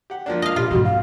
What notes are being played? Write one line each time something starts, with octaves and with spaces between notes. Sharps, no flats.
G4 F#5
F3 A#3 D4
D#5 F5
A#2 F4 G4
F2 G#2 B2 C4 F#4
F5